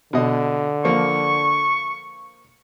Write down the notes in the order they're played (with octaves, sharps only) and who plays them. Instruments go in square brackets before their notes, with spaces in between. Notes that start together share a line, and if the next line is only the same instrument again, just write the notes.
[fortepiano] B2 D#5 [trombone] D3
[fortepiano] F3 A#3 [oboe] C#6